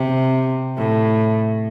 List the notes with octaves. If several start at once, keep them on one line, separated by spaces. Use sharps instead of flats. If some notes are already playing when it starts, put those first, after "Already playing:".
Already playing: C3
A2